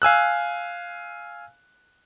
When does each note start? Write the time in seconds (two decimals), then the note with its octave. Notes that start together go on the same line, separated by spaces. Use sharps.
0.02 F5 G#5 E6 F#6